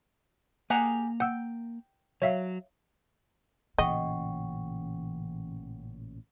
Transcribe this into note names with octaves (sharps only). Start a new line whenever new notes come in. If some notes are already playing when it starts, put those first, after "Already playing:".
A#3 G4 G#4 F#5 A#5
F#5 G5 E6
F#3 C#5 E5 F5
A1 A#2 C#3 E3 D#5 F#5 G5 C#6